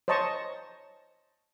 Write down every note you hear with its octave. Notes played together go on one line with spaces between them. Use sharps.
C5 C#5 D#5 A5 A#5 C#6